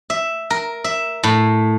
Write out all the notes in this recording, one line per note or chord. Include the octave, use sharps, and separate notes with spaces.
E5
A#4
E5
A2